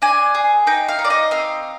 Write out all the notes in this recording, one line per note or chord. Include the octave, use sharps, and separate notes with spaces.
D4 G#5
G#4
D#4 G5
F5
D#4
D5
D#5
C4 F5